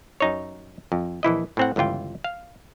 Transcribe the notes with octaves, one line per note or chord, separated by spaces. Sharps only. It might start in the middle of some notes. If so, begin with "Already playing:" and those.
F#2 D#4 C#5
F2
A#1 E3 E4 D#5
A2 C4 F#5
G1 C#2 E3 F4 G5
F5